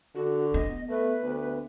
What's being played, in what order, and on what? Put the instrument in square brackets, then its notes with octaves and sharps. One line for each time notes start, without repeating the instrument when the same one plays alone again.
[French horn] D3 [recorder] F#4
[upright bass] B3 [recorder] D#5
[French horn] A3 [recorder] B4
[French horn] D2